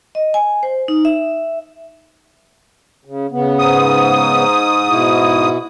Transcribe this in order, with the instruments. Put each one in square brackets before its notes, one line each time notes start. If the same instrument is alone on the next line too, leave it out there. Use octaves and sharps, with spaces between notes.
[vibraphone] D#5
G#5
C5
D#4
E5
[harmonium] C#3
C#3 B3
[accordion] G#2 D#6
[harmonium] B2 E4